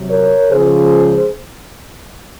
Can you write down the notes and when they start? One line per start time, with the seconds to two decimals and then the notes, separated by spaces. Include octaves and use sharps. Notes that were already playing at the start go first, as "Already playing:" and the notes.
Already playing: C3 F#3
0.08 A#4 C#5
0.50 C#3 F3 G#3 G#4 C5